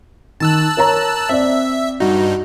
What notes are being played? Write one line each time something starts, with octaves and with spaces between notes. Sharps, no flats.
D#3 A5 E6 F#6
A#4 C#5 A#5
C4 D5 E5
G2 D#4 F#4